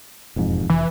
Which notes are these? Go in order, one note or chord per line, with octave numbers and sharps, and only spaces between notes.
E1 F2 G#2
F1 E3